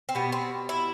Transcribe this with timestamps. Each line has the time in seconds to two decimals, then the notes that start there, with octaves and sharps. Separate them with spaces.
0.09 C4
0.15 B2 G3 B3
0.32 C4
0.69 E4